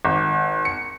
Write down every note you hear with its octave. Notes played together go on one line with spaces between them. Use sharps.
G#1
C#7